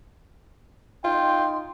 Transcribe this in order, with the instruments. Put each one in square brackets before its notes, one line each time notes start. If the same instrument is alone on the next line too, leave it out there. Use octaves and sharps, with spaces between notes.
[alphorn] D#4 [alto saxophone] F4 [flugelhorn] G5 [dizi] C6